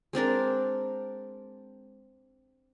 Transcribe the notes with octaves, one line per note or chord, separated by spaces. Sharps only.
G#3 C4 D4 A#4